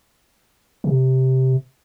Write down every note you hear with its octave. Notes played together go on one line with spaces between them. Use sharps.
C3